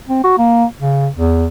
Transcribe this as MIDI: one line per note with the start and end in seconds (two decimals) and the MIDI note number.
0.08 0.21 60
0.24 0.37 66
0.38 0.65 58
0.80 1.08 49
1.15 1.47 40